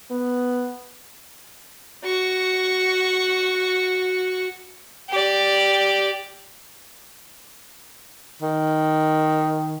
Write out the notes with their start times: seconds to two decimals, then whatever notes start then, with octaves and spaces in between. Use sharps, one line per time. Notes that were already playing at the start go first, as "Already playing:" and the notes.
0.11 B3
2.05 F#4 C#6
5.10 G4 D5
8.42 D#3